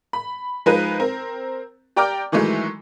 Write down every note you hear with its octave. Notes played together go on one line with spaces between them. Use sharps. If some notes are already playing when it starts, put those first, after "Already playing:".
B5
F3 G#3 D#4 A#4 B4
C4 A#4
G4 D5 G5 A#5 D6 F6
D#3 E3 F#3 G#3 A3